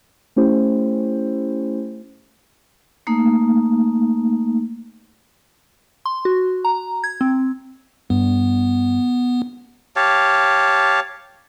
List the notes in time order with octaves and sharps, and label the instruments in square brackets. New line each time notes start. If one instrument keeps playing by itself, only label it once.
[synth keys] A3 C#4 E4 G4 C5
[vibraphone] A3 A#3 D#4
[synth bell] C6
F#4
A#5
G#6
C4
[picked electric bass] G2 [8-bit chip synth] B3
[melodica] G4 C#5 F5 A5